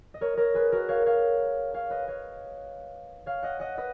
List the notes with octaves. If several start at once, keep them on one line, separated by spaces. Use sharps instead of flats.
D#5
A#4 C#5
A#4 C#5
G#4 B4
F#4 A#4
C#5 F5
C#5 F5
C#5 F5
B4 D#5
C#5 F5
C#5 F5
D#5 F#5
D#5 F#5
B4 D#5